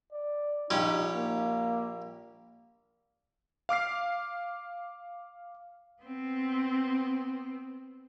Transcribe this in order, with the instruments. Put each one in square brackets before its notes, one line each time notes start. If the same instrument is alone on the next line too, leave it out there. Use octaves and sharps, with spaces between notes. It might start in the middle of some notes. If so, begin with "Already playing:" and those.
[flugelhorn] D5
[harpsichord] A#1 C#4 G4 [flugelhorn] D#4
[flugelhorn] A#3
[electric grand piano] F5 D6 F6 C7
[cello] B3 C4